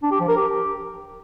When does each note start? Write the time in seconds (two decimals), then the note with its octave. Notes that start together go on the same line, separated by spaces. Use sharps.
0.03 D4
0.11 G4
0.20 F3
0.28 A#4
0.37 G4